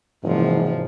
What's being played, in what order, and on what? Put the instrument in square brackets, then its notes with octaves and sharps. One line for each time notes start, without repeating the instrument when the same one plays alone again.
[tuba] F#1 [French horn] G#2 [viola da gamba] C3 F3 [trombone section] E3